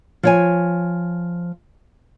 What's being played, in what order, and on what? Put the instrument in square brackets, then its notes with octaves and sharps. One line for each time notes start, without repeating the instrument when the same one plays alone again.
[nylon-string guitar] F3 C#5 G#5